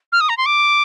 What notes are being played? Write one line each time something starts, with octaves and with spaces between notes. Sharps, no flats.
F6
D#6
A#5
C6
D6